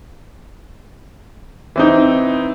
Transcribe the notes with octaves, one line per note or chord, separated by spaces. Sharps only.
E3 C4 D#4